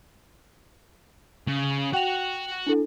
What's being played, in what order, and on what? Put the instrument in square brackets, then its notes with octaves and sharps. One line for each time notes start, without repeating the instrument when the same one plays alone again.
[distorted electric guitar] C#3
[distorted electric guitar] F#4 F#5 [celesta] G5 F7
[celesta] D4 E4 A4